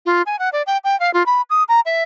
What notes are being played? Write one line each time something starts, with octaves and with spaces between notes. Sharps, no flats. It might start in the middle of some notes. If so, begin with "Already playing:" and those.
F4
G#5
F#5
D5
G5
G5
F5
F4
B5
D#6
A#5
E5